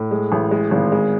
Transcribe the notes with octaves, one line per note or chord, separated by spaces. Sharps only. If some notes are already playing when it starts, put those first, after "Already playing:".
Already playing: A2
G#3
A1
G#3
G#1
G#3